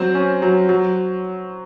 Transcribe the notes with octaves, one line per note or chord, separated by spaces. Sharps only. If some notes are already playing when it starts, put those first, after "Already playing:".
Already playing: F#3 C4 C5
C#4
F#3
F#3